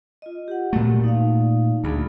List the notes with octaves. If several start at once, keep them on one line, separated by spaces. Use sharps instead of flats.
F4 D#5
G4 F#5
A#2 A3 F#4
D#4 D5 F5
D2 A#3 G#4 B5